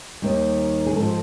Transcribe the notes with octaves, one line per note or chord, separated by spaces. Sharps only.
D#2 D#3 G3
G#4
G#2 F3 A4